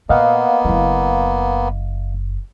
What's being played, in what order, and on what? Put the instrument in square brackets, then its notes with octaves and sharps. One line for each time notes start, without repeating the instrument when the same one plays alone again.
[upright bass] A#2 [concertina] A#3 B3 [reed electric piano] D#5 F5 F#5
[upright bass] F#1 E4